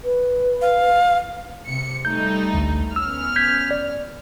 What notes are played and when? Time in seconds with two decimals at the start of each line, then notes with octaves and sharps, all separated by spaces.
0.04 B4
0.61 F5
1.67 C3 C#7
2.05 G3 A3 D#4 G6
2.53 A1 D2
2.96 B3 C#4 E6 F6
3.36 G6 G#6 B6
3.71 D5